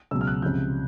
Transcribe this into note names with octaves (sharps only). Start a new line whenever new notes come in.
C#2 B2 F#3 E6
F6
F#6
C#2 C3 F3 G6